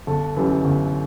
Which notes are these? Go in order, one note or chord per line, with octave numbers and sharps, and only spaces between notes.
G1 A4
F#2 E3 G3
G1